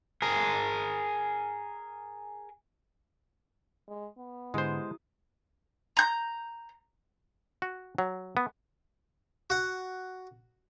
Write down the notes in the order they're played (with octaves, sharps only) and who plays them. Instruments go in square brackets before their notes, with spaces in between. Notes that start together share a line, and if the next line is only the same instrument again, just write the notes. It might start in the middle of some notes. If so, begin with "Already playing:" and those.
[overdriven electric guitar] G#4 A#4
[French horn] G#3
B3
[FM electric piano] G#2 D3 [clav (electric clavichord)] G#3 C5 [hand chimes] E4 G4 D#6
[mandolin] A#5 G6
[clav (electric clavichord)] F#4
F#3
B3
[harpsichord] F#4 F#5